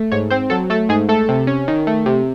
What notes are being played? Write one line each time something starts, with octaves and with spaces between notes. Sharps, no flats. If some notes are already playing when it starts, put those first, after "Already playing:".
Already playing: A3
G#2 C#5
C4 C5
F#3 A4
A3 A4
G#2 G#4
A3 A4
C3
C#4
D#3
A3
C3